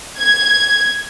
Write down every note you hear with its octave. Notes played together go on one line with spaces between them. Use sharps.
G#6